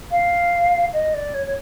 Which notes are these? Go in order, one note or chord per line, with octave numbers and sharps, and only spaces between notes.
F5
D#5
D5
C#5
C#5